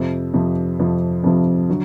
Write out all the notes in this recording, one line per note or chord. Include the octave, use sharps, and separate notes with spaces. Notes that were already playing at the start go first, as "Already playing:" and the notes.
Already playing: F2 C3 F3
F2 C3 F3
F2 C3 F3
F2 C3 F3
D3 F#3